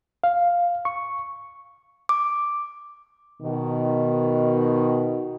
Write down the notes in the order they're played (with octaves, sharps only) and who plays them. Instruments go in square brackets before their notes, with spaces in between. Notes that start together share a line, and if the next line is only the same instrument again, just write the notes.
[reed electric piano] F5
C#6
[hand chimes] D6
[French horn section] B2 D#3